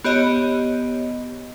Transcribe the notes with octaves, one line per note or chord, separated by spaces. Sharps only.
B3 G4 C#5 D#5